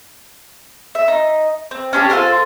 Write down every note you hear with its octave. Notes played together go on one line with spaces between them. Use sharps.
E5
D#4
C4
C#4 D4 E4 G4
F4 A4 A#4 C5